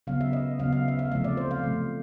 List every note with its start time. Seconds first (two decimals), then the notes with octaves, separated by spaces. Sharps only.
0.07 C#3 F#3 B3 F5
0.21 E5
0.33 D#5
0.59 C#3 F#3 B3 F5
0.73 F5
0.88 E5
0.99 F5
1.12 C3 F3 A3 E5
1.24 D5
1.37 C5
1.51 F5
1.64 C3 F3 A3